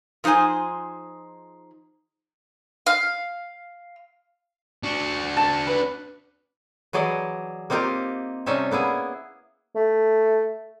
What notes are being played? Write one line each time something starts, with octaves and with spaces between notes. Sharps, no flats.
F3 D#4 G#4 C5 G#5
F5
D4 F#4
A5
B4
E3 F#3 G#4 D5 D#5
A#3 C4 D#4 F4 G4 A#4
C3 G3 C#4 D#4 E5 A5
A#3 B3 E4 G#4
A3